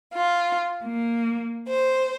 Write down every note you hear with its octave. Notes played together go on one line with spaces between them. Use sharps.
F4
A#3
C5